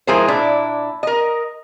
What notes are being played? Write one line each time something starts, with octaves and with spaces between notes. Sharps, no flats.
F3 G#3 E4 G#4 A#4 C5
A#2 D4 E4
A#4 D#5